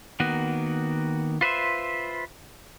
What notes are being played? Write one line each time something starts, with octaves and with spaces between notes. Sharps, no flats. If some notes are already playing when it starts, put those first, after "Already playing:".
D#3 A#3 B3 F#4
F4 B4 C5 E5